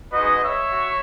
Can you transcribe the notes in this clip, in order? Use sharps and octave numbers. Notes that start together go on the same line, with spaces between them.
G#3 D#4 F#4 B4 D#5
C#5 E5
F#4